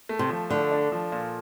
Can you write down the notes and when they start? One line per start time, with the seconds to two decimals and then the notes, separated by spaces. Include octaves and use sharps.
0.09 A3
0.19 C3
0.30 F3
0.50 D3 A3
0.72 D4
0.92 F3
1.12 A#2